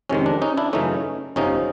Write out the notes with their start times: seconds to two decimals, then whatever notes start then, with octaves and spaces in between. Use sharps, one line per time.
0.09 F2 C3 D#3 G#3 C#4
0.26 D4
0.42 C#4 D#4
0.57 D4 E4
0.73 F#2 C#3 E3 A3 C#4 D#4
1.36 G1 F2 C3 F3 C#4 D#4